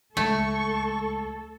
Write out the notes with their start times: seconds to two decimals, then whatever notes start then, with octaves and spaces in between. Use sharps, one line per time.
0.17 C#2 G#3 A3 A4 C#6 G#6